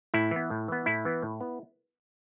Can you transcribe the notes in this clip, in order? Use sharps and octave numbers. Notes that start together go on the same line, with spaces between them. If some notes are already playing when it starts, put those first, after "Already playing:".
A2 E4
E3 B3
A2
E3 B3
A2 E4
E3 B3
A2
B3